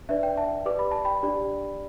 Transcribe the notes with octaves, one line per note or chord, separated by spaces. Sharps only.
D4 B4 D5 E5
G5
E5 A5
G4 B4 D5 D6
B5
A5
G5 B5
D4 G4 D5